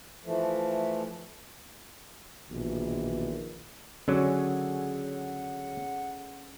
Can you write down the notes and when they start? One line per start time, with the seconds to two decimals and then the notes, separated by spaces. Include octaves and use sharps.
0.24 E3 F3 A3
2.50 A#1 B2 D#3 E3
4.08 D3 F#3 C#4 G#4 A4 C#5 F#5